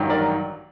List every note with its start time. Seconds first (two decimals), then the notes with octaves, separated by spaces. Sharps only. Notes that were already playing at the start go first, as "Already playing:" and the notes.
Already playing: A1 G2 D#3 F#3
0.09 A#4 D5